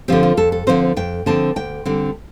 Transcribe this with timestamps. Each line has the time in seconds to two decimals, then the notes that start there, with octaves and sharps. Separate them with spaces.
0.08 D3 F3 C4 G4
0.23 F4
0.37 F2 A4
0.52 A4
0.67 D3 F3 C4 C5
0.97 F2 G5
1.26 D3 F3 C4 A5
1.56 D2 G5
1.86 D3 G3 C4